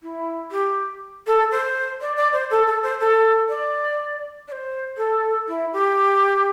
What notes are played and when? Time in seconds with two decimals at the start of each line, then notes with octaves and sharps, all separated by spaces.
0.03 E4
0.51 G4
1.27 A4
1.51 C5
2.01 D5
2.16 D5
2.33 C5
2.51 A4
2.67 A4
2.83 C5
3.00 A4
3.49 D5
4.48 D5
4.52 C5
4.97 A4
5.48 E4
5.73 G4